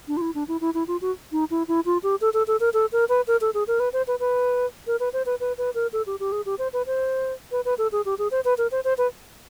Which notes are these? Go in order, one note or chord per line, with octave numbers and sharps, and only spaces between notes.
D4
F4
E4
D4
E4
E4
E4
F4
F#4
D#4
E4
E4
F4
G4
A4
A4
A4
A#4
A4
A#4
B4
A#4
A4
G#4
A#4
B4
C5
B4
B4
A#4
B4
C5
B4
B4
B4
A#4
A4
G4
G4
G#4
G4
C5
B4
C5
B4
B4
A4
G#4
G4
G#4
C5
B4
A#4
C5
C5
B4